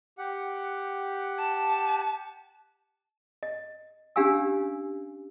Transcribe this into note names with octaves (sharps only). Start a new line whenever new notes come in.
G4 F#5
A5
D#5
C#4 D4 G4 F5 G#5 E6